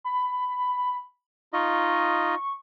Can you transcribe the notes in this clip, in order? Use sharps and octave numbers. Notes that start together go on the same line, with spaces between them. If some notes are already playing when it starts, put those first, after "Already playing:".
B5
D#4 F4 D#5 C#6